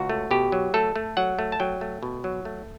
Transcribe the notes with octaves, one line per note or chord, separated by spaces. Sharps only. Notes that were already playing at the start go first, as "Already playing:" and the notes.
Already playing: C#2 F#4
A3
B2 G4
F#3
A3 A4
A3
F#3 F#5
A3
A5
F#3 G5
A3
B2
F#3
A3